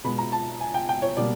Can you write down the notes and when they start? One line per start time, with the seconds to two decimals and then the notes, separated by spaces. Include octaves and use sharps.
0.04 B2 G#3 B3 B5
0.18 A#5
0.32 A5
0.61 G#5
0.74 G5
0.89 G5
1.02 C#5
1.17 B2 G3 A#3 D5